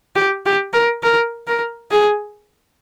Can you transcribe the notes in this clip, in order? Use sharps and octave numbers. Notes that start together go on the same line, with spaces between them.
G4
G4
A#4
A#4
A#4
G#4